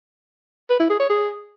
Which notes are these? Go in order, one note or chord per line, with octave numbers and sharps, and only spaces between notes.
B4
E4
G#4
C#5
G#4